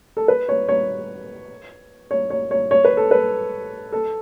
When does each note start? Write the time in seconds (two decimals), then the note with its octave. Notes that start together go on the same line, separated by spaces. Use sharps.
0.17 A4
0.28 B4
0.49 C#5
0.69 C#5
2.11 C#5
2.30 C#5
2.51 C#5
2.71 C#5
2.85 B4
2.97 A4
3.11 B4
3.92 A4